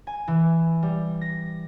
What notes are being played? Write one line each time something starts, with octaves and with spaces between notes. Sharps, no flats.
G#5
E3
G3
A#6